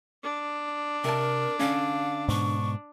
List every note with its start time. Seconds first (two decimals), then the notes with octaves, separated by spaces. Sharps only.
0.23 D4
1.04 C3 A#4 A5
1.59 D3 C#4 F5
2.29 G#2 B2 C#6